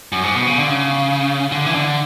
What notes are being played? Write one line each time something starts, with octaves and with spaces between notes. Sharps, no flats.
F#2
G#2
B2
C#3
D3
C#3
D3
E3
D3